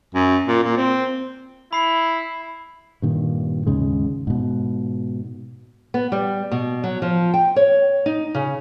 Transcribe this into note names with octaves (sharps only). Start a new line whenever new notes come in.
F#2
A#2
A#2
C4
E4 B5 C7
G2 A#2 D#3
D#2 G#2 C#3 G#3
G#2 B2
B3
G3
B2
F#3
F3
G5
C#5
D#4
C#3